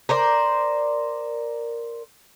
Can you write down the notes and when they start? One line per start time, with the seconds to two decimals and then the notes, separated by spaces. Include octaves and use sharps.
0.09 A#4 C5 D5